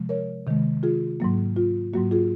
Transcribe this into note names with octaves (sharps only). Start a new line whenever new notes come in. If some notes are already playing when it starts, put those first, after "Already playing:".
Already playing: C3 F3 G#3
A#4 C#5
C3 D#3 G#3
F4 G#4
G#2 F#3 A#3
F4
G#2 F#3 A#3 F#4
F4 G#4